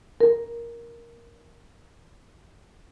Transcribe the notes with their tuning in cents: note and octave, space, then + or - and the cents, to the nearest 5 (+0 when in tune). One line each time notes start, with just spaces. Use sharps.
A#4 +5